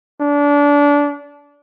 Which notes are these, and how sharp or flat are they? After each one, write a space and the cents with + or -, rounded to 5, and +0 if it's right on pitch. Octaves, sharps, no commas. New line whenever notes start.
D4 -25